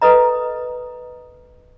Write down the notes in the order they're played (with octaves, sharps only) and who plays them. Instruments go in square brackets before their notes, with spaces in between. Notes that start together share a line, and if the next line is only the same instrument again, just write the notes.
[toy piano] A4 B4 D#5 A#5